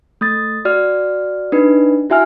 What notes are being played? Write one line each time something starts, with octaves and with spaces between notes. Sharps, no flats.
A3 D#6 A6
F#4 D5 F6
D4 D#4 B4
E4 F#4 E5 G#5 F6